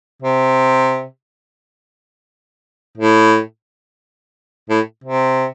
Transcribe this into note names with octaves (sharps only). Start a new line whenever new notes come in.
C3
A2
A2
C3